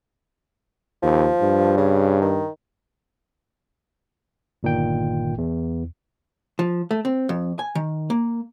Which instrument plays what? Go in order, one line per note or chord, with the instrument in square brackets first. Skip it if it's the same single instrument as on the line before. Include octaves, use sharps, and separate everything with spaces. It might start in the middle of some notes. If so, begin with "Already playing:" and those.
[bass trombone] D#2 [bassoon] F3
[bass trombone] G2
[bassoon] C#3
D#3
[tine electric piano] G1 A#2 D#3 G5
E2
[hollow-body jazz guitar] F3
A3
C4
F2
G#5
D#3
A#3